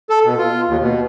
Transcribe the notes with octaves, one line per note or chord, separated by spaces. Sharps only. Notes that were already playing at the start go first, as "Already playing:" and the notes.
A4
B2
F4
D#2
B2